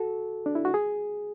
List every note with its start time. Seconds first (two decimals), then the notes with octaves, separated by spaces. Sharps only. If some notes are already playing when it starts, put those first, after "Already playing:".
Already playing: F#4 A4
0.46 D4
0.55 E4
0.65 F#4
0.74 G#4